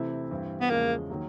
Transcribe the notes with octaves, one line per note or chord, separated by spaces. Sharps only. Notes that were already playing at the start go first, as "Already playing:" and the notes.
Already playing: C3 E3 A3 C4 E4
G2 E3 G3 C4
B3
E2 C#3 F3 G#3 A#3
D#3 F#3 A#3